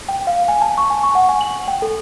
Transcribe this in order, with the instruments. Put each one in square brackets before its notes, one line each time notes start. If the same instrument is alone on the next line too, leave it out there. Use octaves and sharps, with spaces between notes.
[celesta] G5
F5
G#5
A5
C#6
G#5
C#6
F#5
G#5
F#7
G5
A4